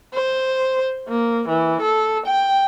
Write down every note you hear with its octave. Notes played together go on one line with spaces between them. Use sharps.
C5
A#3
E3
A4
G5